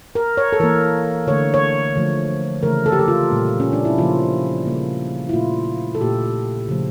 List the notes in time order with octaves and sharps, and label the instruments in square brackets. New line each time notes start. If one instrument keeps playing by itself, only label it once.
[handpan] A#4
C#5
A4
E3 A#3 A#4
D3 A3 C#5
C#5
D3 F3 A3
C#3 E3 A3 A#4
A4
G4
A4
F4
A#2 G3 A#3
C#4
D4
E4
C#3 F3 A#3 F4
C#3 G3 A#3
E4
A#2 A3 F4
A4
A#2 A3 G4
C#3 F3 A3